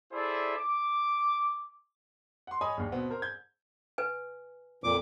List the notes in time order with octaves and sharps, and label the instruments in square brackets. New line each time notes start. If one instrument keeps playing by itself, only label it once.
[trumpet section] E4 G#4 A4 C5 D5 E5
D6
[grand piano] F#5 C6
C#5 D#5 G#5 B5 D#6
A#1 D#2
B2 B3 C4
A#4 C5 A#5
G6 G#6
[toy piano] B4 G#5
[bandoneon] F2 A#2 D6